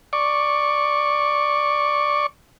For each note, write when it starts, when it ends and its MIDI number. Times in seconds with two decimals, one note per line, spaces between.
0.13 2.26 74
0.13 2.26 85